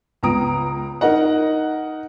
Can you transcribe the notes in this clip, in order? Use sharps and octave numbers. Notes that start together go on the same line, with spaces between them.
C#2 B3 A#5 D#6 D7
D#4 A#4 D#5 F#5